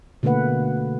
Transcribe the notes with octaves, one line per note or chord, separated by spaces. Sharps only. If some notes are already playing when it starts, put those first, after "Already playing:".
B2 D3 A3 A#3 B4 F#5